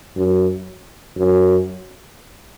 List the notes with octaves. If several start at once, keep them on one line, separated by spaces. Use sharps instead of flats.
F#2
F#2